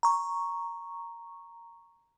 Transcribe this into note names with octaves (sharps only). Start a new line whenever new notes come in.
A#5 C#6